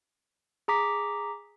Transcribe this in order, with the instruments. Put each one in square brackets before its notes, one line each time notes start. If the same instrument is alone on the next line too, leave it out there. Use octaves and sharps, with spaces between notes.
[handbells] G#4 A#5 D6 B6